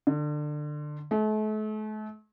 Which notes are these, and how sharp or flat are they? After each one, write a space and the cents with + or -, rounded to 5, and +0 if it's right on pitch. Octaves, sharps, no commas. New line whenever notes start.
D3 +25
A3 -40